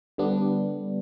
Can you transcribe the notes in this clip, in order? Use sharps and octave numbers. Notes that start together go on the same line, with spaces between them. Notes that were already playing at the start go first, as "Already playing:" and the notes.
D3 G3 B3 D4